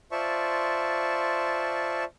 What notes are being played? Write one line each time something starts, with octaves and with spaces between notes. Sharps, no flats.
F4 C5 D5 E5 A5 C#6